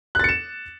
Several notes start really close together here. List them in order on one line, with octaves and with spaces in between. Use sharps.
F#6 A6 C#7 E7